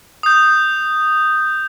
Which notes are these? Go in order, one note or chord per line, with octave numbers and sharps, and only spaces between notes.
D#6 G6